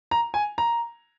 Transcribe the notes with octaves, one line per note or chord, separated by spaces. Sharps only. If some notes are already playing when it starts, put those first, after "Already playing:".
A#5
G#5
A#5